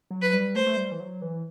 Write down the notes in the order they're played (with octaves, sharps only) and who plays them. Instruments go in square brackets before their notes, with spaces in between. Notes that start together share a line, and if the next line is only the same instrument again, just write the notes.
[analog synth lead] F#3
[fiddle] B4
[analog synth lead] G3
[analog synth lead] A3 [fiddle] C5
[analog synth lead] A3
G3
E3
F#3
E3